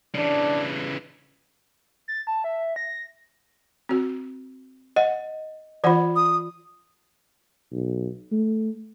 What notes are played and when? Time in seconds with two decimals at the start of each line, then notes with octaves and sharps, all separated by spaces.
0.15 C#3 E3 D4
2.08 A6
2.27 A5
2.44 E5
2.76 A#6
3.89 C4 F#4
4.96 D#5 F#5
5.84 E3 F4 C5 D5 F#5
6.16 D#6
7.72 B1
8.32 A3